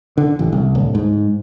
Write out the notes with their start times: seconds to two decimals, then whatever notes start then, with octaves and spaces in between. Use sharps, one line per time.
0.18 D3
0.39 A1
0.52 C2
0.75 D1
0.95 G#2